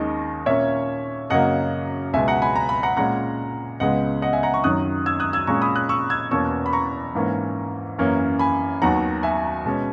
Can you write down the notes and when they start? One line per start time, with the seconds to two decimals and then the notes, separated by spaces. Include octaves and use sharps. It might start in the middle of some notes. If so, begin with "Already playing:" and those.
Already playing: D#2 D#3 G#3 C#4 D#5
0.46 A#2 A#3 C#4 C#5 E5
1.30 F#2 C#3 F#3 A#3 D#5 F#5
2.13 C#2 B2 G#3 E5 G#5
2.28 F#5 A#5
2.42 G#5 B5
2.56 A#5
2.69 B5
2.83 F#5 A#5
2.97 A#2 G#3 C#4 F#5 A#5
3.80 C#2 C#3 G#3 B3 D#5 F#5
4.22 D#5 F#5
4.33 E5 G#5
4.43 F#5 A#5
4.54 A#5 C#6
4.64 F#2 D#3 F#3 D#6 F#6
5.06 E6 G#6
5.20 D#6 F#6
5.33 E6 G#6
5.47 A#2 G#3 C#4 A#5 C#6
5.62 B5 D#6
5.75 D#6 F#6
5.89 C#6 E6
6.10 E6 G#6
6.31 E2 B2 A#3 C#4 C#6 E6
6.66 B5
6.73 A#5 C#6
7.15 G#2 E3 A#3 C#4
7.98 F#2 E3 A#3 C#4
8.39 G#5 B5
8.82 D#2 D#3 F#3 B3 F#5 A#5
9.23 E5 G#5
9.65 B2 G#3 C#4